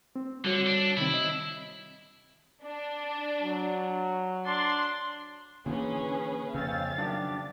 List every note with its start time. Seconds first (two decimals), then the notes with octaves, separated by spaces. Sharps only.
0.16 C4
0.44 D3 G3 F#4 C#5
0.66 D4
0.97 C3 D#3 C4 E4
1.14 D#5
2.62 D4
3.43 F#3
4.46 D4 C6
5.66 A#2 D3 E3 C#4 G#4 B4
6.54 F2 C#3 C4 C#4 F5 A6
6.98 F#2 D#3 D4 G4